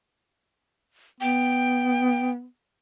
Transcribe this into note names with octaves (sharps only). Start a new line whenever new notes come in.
B3 G5